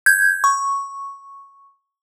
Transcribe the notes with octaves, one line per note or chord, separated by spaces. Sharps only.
G6 G#6
C#6